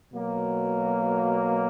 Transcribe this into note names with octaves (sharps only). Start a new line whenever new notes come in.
B2 F#3 A#3